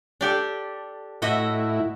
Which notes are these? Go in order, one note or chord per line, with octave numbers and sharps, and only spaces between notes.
D4 G4 A4
A2 E4 F#4 D#5 E5